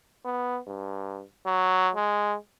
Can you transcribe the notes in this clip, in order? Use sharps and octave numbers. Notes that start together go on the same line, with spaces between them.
B3
G2
F#3
G#3